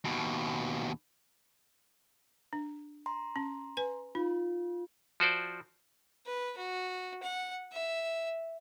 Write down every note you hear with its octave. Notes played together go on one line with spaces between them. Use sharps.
D#2 B2
D4
A#5 C6
C#4
B4 G#5
D#4 F4
F3 F#4 C5 D5
B4
F#4
F#5
E5